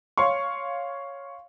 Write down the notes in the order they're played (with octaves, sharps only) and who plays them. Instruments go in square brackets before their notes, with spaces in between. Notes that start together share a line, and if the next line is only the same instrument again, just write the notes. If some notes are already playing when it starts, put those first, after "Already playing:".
[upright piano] C#5 F5 C6 C#6